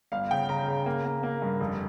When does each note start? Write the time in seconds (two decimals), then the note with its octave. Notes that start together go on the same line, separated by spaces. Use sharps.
0.12 G1 F5
0.31 C#3 G5
0.49 C#3 A#5
0.68 C#3
0.86 A#3
1.05 A#3
1.23 A#3
1.42 G2
1.60 F1